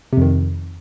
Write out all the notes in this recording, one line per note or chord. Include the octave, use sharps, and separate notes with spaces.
F2 C3 D#3